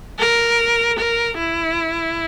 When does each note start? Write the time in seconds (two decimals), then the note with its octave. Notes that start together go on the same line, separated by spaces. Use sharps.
0.20 A#4
0.99 A#4
1.39 E4